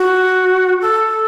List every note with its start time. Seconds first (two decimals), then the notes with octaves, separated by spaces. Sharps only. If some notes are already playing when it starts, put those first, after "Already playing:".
Already playing: F#4
0.81 A4